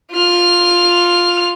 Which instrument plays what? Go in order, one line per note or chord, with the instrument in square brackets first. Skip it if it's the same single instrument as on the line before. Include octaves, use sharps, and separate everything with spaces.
[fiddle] F4 F6